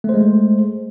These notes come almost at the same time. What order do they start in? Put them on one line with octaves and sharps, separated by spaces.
A3 C5 G#3